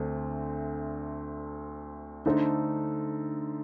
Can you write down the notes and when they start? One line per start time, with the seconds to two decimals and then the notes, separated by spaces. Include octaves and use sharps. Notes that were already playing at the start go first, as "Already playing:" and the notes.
Already playing: D2 D3 A3 C4
2.26 D3 A3 D#4 A4 C5